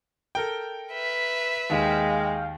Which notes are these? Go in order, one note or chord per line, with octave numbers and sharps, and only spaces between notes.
A4 A#4 G5
B4 E5
D#2 D#3 G#3 F5 G5